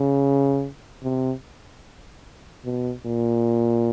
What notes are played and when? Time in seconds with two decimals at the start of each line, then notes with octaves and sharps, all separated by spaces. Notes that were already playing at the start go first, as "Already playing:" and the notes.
Already playing: C#3
1.04 C3
2.65 B2
3.06 A#2